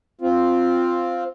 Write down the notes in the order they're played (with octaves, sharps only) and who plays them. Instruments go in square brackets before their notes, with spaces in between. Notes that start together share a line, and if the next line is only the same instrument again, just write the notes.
[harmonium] C4 F4